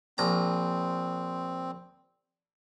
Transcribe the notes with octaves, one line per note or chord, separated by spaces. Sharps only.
A#1 C4 A#5